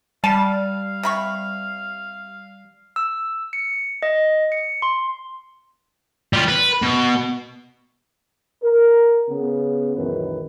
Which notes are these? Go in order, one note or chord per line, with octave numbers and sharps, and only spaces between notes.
G3 F5 A5
C3 B5 C#6
E6
C#7
D#5
C#7
C6
G3 F4
B4
B2
A#4
C#3 B3
C#2 F#2 A#2 D#3 E3 B4